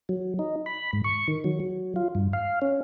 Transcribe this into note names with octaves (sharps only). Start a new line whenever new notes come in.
F#3
D#4
B5
G#2
C#6
D#3
F#3
F#3
F4
G2
F5
C#4